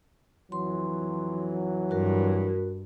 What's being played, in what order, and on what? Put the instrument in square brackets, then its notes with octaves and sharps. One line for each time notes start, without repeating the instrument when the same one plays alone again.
[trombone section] F2 E3 F#3 [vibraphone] C6
[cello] G2 [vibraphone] F#4 A#4